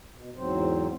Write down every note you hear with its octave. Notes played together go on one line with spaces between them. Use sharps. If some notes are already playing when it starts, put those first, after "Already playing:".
B2
E2 G#2 F#3 C4 C5